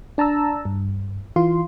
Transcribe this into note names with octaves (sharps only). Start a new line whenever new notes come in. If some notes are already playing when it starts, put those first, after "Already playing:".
D4 A5 A#5 E6
G2
E3 F4 C6